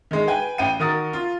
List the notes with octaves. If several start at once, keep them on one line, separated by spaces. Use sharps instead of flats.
D#3 G#3
B4 G5 G#5
A1 G5 D#7
D#3 F#4 A#4 D#6 A6
F4